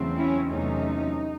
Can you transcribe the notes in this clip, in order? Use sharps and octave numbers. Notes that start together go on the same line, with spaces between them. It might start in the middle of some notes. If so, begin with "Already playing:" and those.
Already playing: E2 C#3 F#3 A3 C4
C#4 E4
E2 C3 F#3 A3 C#4 D#4